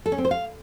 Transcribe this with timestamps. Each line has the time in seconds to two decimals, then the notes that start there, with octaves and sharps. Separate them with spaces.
0.06 A4
0.12 C#4
0.18 C4
0.25 C5
0.31 F5